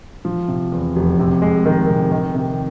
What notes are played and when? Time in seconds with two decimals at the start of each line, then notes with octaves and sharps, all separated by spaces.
0.25 F3
0.48 C3
0.72 E2
0.96 F1
1.19 C3
1.42 G#3
1.66 D#3
1.89 C3
2.12 D#3
2.35 C3